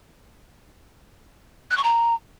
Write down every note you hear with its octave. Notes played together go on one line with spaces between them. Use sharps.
F#6
C#6
A#5